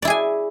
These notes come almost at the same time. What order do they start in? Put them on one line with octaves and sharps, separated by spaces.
D5 E4 G#4 G#5